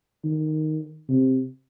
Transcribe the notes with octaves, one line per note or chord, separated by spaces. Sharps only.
D#3
C3